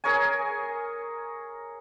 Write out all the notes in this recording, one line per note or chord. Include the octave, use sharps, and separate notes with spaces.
G#4 A#4 C#5 G#5